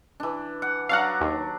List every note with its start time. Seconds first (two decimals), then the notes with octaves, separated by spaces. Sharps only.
0.20 E3 D4
0.62 F#5
0.89 F#3 D4 F5 F#5 A#5
1.21 D#2